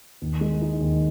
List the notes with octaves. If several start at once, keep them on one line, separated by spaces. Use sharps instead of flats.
D#2
G#3
D#4
D#2